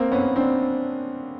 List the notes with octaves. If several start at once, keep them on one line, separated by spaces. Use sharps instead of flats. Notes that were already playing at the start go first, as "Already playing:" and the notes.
Already playing: A#3 C4
B3 C#4
C4 D4